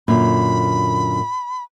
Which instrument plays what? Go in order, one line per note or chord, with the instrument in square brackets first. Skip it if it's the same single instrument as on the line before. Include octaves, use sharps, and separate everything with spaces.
[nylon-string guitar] F#2 A#2 D3 [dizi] B5